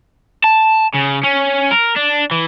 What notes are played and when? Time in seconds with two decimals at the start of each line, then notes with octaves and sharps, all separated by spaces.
0.44 A5
0.95 C#3
1.24 C#4
1.72 A#4
1.97 D4
2.31 E3